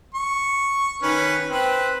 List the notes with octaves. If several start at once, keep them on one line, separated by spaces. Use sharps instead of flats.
C#6
D#3 C#4 B4
C4 B4